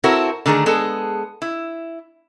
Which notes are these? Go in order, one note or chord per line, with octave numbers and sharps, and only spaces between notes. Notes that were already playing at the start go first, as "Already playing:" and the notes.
C4 E4 F#4 A4 A#4 C5
D3 D#3 A3 G#4 A#4
G#3 B3 G#4 A4
E4